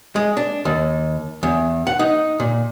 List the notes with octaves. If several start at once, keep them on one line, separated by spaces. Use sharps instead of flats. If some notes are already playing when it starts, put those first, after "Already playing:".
G#3
D4
D#2
E2
F#5
D#4
A#2